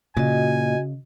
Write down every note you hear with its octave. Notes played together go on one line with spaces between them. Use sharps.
A#2 C#3 F#4 D#5 G#5